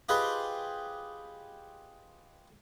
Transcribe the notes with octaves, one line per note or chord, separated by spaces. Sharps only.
F4 G4 G#4 B4 C5 D#5